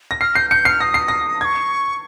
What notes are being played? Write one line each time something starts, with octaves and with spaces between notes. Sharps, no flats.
A#6
F6 C7
G6 C7
G6 C#7
F6 C7
D#6 A#6
C7
A#6
C#6 D#6 G#6